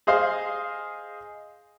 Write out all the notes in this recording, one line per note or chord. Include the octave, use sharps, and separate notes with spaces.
G#4 C5 D#5 F5